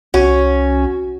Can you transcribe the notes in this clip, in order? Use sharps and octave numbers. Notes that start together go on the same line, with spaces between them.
C2 C#4 F#4